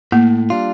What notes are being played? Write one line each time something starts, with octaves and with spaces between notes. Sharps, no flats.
A2 A#3
G3 D4 F4